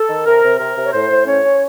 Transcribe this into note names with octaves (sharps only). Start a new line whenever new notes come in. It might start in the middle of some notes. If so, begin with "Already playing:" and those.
Already playing: A4
D#3
C3 A#4
C3
C3 A#4
C3
C#5
A2 C5
A2
C#4 C#5
C#4